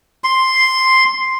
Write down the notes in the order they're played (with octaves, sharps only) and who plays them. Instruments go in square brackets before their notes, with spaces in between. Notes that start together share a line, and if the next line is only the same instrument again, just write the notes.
[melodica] C6